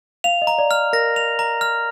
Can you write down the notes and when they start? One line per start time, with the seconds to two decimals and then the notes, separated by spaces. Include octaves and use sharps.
0.24 F5 F7
0.42 D#5
0.47 A#5
0.58 D5
0.71 F6
0.93 A#4 A#6
1.16 F7
1.39 A#5
1.61 F6